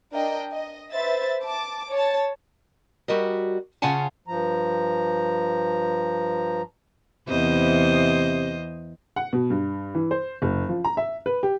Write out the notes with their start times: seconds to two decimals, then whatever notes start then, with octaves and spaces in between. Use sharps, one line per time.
0.12 D4 A#4 D#5 G5
0.50 D#5
0.93 B4 C5 E5 A6
1.44 A5 D6
1.89 C#5 A5
3.08 G3 F#4 G4 A#4 D#5
3.82 C#3 C#4 F4 F#5 G#5 A5
4.28 G2 F3 A#5
7.29 E2 C3 C5 D#5
9.16 F#5
9.33 B2
9.50 G2
9.95 E3
10.11 C5
10.42 F#1
10.69 F3
10.84 A#5
10.97 E5
11.26 B4
11.43 G4